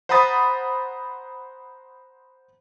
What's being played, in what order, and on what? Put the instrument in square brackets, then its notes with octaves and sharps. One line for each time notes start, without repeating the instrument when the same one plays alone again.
[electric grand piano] C5 F#5 A#5 B5 D#6 A6